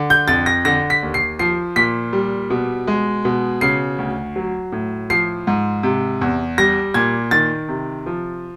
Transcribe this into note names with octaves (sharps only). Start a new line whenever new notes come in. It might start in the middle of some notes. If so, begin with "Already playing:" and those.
Already playing: D3
G6
F2 A6
A#6
D3 A#6
B6
D#2
C7
F3 C7
A#2 B6
G3
B2
G#3
B2
C#3 C7
D2
F#3
A2
F3 C7
G#2
C3
E2
G3 A#6
A#2 G#6
D#3 A6
C3
F3